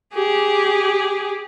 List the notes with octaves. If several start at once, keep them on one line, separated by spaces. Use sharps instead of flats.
G4 G#4